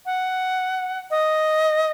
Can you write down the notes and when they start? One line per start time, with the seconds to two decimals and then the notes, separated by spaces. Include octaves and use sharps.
0.06 F#5
1.10 D#5